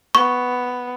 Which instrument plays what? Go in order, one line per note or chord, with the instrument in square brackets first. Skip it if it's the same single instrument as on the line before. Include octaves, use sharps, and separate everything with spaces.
[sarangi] B3 [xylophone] C#6